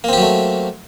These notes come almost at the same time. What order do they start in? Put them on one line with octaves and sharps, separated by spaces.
A#3 C4 G4 F#3 A3